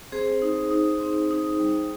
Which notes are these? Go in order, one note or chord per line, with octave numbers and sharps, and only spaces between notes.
C4 G#4 C5
D#4
D#4
C4
D#4
G3